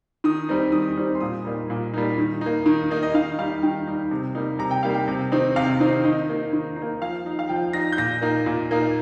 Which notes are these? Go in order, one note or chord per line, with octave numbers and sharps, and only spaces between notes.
D#3 D#6
G3 C4 D#4
D#3 D#6
G3 C4 D#4
C6
A#2 D#6
G3 A#3 D#4
A#2
G3 A#3 D#4
D#3
A#3 D#4
D#3
A#3 D#4
D#5
D#3 F5
G3 D#4 F5
D#3 G5
G3 D#4
C3
G3 A#3 D#4
C3 A#5
G5
G3 A#3 D#4 F5
G5
C3
D#3 C4 D#4
C3 F5
D#3 C4 D#4
D#3 D#5
A#3 D#4
D#3
D#4
A#3
F3 F5
D#4
F5
F3 G5
D#4 A#6
G6
A#2 A#6
A#3 D#4
A#2
A#3 D#4